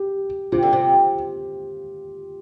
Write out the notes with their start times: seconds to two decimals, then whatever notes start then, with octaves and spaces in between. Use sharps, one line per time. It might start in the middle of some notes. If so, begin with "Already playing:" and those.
Already playing: G4
0.52 C3 F4
0.63 D3
0.73 C3